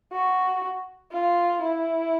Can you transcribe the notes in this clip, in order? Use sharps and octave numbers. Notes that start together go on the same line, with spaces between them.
F#4
F4
E4